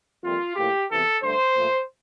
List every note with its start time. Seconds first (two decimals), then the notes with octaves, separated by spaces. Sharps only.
0.23 F2 C3 G3 A#3 F4
0.55 A2 F3 A#3 G4
0.88 E2 C3 E3 A4
1.21 G2 D3 A3 C5
1.54 A#2 F3 A3